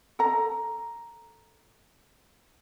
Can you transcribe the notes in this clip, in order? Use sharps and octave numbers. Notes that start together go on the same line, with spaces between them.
A4 A#5